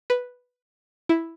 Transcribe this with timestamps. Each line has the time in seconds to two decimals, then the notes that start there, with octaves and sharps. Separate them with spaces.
0.10 B4
1.09 E4